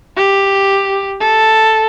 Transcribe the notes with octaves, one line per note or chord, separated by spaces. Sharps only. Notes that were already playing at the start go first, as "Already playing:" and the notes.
G4
A4